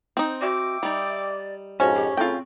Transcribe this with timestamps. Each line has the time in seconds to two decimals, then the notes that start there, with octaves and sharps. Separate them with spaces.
0.17 C4 D#4
0.42 F#4 E5 G5 D6
0.83 G3 D#4 D5
1.80 F2 G#2 C#4 F#4
1.95 G4
2.17 A2 C#3 C4 F4 G5